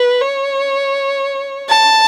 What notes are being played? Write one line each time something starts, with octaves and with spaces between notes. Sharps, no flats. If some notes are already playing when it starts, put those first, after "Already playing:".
Already playing: B4
C#5
A5